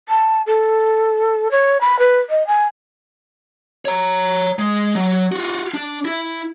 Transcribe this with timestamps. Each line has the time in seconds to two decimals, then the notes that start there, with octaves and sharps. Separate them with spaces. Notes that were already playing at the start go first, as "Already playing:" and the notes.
0.08 A5
0.46 A4
1.51 C#5
1.81 B5
1.99 B4
2.30 D#5
2.47 G#5
3.85 C#5 A#5
4.59 G#3
4.95 F#3
5.32 F4 F#4
5.74 D4
6.05 E4